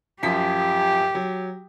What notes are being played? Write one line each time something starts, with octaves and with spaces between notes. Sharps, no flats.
F#2 F3 G4 B6
F#3